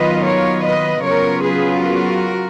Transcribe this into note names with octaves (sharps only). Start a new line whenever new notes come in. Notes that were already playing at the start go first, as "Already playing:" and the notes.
Already playing: D#3 F#3 B3 F4 B4 D#5
A#4 C#5
B4 D#5
C#3 F#3 B3 F4 A#4 C#5
G#4 B4
F#4 A#4